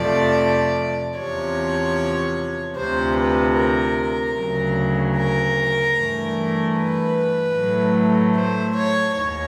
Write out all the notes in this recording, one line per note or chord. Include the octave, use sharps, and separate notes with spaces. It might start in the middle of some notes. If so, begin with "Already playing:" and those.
Already playing: F2 C3 F3 A3 D5
E2 C3 F3 C#5
D2 C3 F3 C5
B4
A#4
D2 C#3 F#3
A#4
G2 E3 A3
B4
A2 F#3 A3
C5
C#5
D#2 D#3 C#5